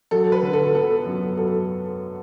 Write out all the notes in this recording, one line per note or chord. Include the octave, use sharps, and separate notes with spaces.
F#3 A4
B4
D3
A4
B3 A4
F#2
F#3 A4